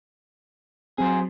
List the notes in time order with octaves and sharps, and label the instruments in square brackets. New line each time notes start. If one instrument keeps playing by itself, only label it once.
[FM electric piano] F#3 C4 [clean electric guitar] G#4 C5